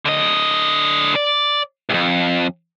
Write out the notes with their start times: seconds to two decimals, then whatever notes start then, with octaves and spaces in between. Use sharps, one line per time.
0.06 D3 D#5
1.15 D5
1.90 C2 F2